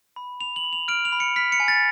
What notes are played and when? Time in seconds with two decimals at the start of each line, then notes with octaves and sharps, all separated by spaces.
0.16 B5
0.41 B5 F7
0.56 F#7
0.64 B5
0.73 F7
0.88 F6 D7
1.05 F7
1.12 B5
1.20 C#7
1.36 F6 B6
1.52 C#7
1.60 G#5
1.68 A6